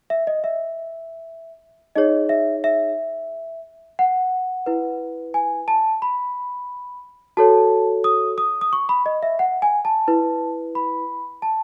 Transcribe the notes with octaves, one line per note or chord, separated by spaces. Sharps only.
E5
D#5
E5
D#4 G#4 C#5 D#5
E5
E5
F#5
E4 B4
G#5
A5
B5
F#4 A4 C#5 A5
D#6
D#6
D#6
C#6
B5
D#5
E5
F#5
G#5
A5
E4 B4
B5
A5